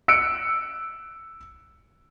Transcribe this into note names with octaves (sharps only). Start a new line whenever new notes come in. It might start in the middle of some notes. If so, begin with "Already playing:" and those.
E6 F#6 C#7 D7